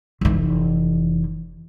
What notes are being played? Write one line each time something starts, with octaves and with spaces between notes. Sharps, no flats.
F1 E3